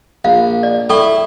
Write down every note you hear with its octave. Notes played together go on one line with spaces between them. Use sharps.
A#1 F5
D5
E4 A4 G5 C#6